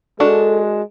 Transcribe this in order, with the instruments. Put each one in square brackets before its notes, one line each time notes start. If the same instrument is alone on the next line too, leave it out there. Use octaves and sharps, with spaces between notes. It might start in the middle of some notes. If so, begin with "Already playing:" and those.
[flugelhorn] G#3 [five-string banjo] D4 F#4 A#4 [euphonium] A4